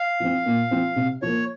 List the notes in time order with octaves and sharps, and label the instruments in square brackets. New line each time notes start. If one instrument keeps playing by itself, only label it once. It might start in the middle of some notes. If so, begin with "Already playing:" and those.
Already playing: [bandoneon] F5
[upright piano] F3 C4
A#2
F3 C4
C3
[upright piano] F3 A#3 [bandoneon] C#5